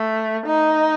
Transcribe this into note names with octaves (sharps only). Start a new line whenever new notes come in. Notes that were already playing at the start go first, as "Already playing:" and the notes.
Already playing: A3
D#4